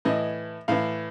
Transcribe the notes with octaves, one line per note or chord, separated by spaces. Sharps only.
A2 E3 D#5
A2 E3 F5